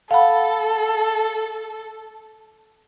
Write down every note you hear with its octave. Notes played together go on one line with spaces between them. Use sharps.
A4 F5 F#5 B5